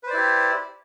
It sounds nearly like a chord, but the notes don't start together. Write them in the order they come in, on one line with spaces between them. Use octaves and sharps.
B4 C5 D5 E4 G4